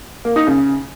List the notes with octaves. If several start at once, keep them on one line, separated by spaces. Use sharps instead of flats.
A#3
D#4
C#3